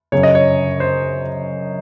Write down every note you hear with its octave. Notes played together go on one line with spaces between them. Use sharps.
F#2 C#3 C#5
D#5
C#5
C5